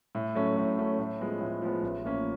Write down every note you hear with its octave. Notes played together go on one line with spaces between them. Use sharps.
A2
F#3 A3 C#4
A2
F#3 A3 C#4
A2
F3 G#3 B3
A2
F3 G#3 B3
A1
A2 F3 A#3 C#4